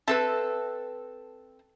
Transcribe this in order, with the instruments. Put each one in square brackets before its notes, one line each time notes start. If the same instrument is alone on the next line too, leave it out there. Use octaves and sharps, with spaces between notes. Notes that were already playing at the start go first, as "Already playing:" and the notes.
[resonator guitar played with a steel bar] C4 A4 B4 [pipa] E5 A5